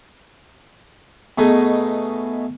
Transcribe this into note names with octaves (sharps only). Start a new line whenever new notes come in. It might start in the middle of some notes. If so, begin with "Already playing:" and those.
B2 A3 D#4 G#4